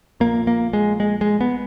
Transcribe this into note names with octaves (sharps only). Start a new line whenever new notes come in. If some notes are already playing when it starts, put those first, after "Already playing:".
A#1 A#2 A#3
A#3
G#3
G#3
G#3
B3